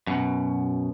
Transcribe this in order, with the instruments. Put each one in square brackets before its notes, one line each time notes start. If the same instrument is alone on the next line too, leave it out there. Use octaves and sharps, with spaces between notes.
[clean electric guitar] F#2 B2